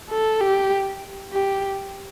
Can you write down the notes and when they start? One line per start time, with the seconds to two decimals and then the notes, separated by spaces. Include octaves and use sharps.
0.10 A4
0.41 G4
1.33 G4